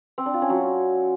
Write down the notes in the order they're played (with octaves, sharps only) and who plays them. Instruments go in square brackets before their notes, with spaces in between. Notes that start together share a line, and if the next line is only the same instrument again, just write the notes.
[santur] C4
D4
F4
C#4
F#3